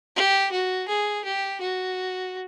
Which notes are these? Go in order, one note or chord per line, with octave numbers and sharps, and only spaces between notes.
G4
F#4
G#4
G4
F#4